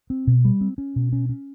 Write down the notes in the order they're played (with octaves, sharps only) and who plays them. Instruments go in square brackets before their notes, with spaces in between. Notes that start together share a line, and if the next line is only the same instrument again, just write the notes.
[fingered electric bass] C4
B2
G3
C4
C#4
B2
C#4
C#4